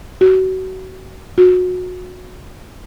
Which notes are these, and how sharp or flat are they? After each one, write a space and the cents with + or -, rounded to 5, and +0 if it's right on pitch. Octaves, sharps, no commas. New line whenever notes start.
F#4 +25
F#4 -25